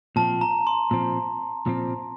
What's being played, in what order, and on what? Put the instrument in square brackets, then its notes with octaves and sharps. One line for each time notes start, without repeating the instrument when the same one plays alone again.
[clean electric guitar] A#2 F3 C4 [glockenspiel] A5
[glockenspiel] A#5
C6
[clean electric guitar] A#2 F3 C4
A#2 F3 C4